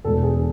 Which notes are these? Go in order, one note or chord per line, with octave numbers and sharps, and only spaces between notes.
E1 E2 B2 G#3 A4
G#4